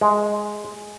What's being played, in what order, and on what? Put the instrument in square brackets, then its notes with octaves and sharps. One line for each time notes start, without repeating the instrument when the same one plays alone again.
[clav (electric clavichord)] G#3